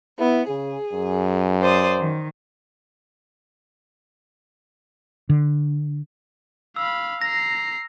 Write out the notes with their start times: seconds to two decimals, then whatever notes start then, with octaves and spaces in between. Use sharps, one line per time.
0.19 B3 E4
0.49 C#3 G#4
0.93 F#2
1.62 C5 D5 D#6
1.99 D#3
5.29 D3
6.76 F5 B5 E6
7.21 A#5 A#6 C7